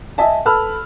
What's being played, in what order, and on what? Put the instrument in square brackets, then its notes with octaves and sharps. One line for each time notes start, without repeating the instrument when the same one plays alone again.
[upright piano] D#5 E5 G#5 A5
A4 B4 A5 B5 E6 F6